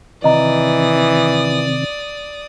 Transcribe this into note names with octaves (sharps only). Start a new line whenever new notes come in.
C3 D#3 E3 C4 D5 D#5 A#5 D#6